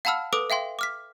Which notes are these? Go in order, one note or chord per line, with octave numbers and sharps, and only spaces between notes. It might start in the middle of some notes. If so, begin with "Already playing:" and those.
F5 F#5 A5 B5 E6 F6
A4 B4 D6 D#6 D7
E5 F5 G5 C6
D6 F6 B6